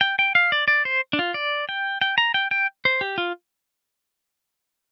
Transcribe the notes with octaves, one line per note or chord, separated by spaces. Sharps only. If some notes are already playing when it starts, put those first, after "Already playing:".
G5
G5
F5
D5
D5
C5
D4
F4
D5
G5
G5
A#5
G5
G5
C5
G4
F4